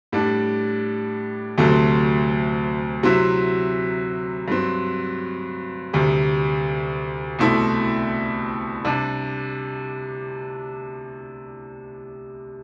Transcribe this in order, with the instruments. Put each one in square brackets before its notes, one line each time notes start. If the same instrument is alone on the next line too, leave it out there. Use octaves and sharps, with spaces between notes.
[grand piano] A2 G3 D4
D2 C3 F#3 A3 C4
C3 F#3 C4 E4
G2 F#3 C4
D2 C3 G3
C2 B2 A3 C4 E4
C3 G3 D4